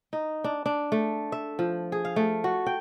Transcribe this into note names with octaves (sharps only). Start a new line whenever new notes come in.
D#4
D4
D4
A3
E5
F3
G#4
F5
A3
F#4
G5